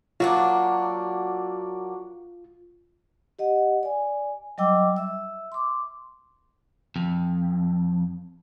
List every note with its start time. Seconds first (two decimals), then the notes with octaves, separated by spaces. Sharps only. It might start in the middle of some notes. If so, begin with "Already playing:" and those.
0.20 F#3 A#3 D4 F4
3.39 G4 D#5 F#5
3.83 D5 G#5
4.58 F#3 G3 D#5 G5 D6 E6
4.96 E5 E6
5.52 C6 D6
6.96 F2